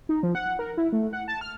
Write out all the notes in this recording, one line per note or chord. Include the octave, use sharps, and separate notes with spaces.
D#4
F3
F#5
A#4
E4
A3
F#5
A5
F6